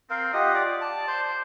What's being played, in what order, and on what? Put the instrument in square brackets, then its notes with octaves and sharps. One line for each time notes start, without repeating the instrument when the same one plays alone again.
[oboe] C4 [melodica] A#4 F5
[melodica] F4 G4 F#5 [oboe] D#5
[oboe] D5
[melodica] A5
[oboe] C5